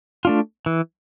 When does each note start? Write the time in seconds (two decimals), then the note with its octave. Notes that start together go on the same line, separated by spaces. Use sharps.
0.25 A3 D4 F4
0.66 E3